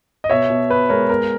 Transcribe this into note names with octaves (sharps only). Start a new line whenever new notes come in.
D#5
B2 C#5 E5
B2
B3 B4
G#3 A#4 C#5
B3 A#4